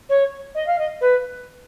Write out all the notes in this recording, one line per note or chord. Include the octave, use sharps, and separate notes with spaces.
C#5
D#5
F5
D#5
B4